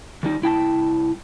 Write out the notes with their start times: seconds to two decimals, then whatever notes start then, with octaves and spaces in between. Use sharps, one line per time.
0.23 D#3 G3 D#4
0.42 C2 E4 G5 A5